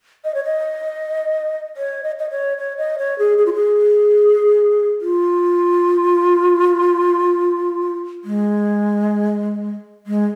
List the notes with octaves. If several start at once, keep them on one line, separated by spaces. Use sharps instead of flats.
D#5
C#5
D#5
C#5
D#5
D#5
C#5
C#5
D#5
C#5
G#4
G#4
F4
G#4
F4
G#3
G#3